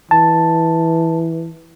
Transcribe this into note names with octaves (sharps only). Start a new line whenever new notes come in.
E3 A5